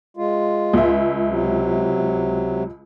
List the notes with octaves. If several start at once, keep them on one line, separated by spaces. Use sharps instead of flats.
G#3 F4
C#2 E5
C3 F#3